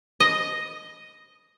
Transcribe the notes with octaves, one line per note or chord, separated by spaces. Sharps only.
D#5